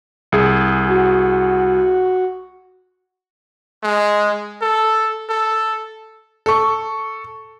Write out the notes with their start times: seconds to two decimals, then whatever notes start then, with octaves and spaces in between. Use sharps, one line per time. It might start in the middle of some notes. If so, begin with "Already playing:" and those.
0.32 C2 G#4
0.88 F#4
3.83 G#3
4.61 A4
5.29 A4
6.46 A4 C#6